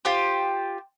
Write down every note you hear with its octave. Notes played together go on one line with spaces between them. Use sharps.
F4 G4 C5